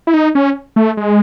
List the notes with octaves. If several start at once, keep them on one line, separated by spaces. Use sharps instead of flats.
E4
D#4
C#4
A3
G#3